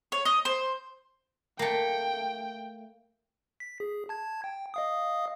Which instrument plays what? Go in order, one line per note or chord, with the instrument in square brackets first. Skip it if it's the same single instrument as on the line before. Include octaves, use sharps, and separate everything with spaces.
[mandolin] C#5
D#5
C5
[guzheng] A3 A#3 [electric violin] G5
[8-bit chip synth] B6
G#4
A5 G#6
G5
D#5 F5 D#6